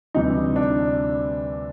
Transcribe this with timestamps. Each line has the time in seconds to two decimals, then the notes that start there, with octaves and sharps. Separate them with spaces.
0.14 D2 C3 E3 G3 D#4
0.56 D4